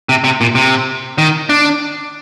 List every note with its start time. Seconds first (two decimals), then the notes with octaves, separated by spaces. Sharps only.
0.09 C3
0.24 C3
0.41 A#2
0.55 C3
1.18 D#3
1.49 D4